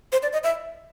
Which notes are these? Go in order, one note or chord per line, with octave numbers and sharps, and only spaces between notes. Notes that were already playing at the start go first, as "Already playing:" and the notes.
C5
D5
D#5
E5